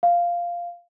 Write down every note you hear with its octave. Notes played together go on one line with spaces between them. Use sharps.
F5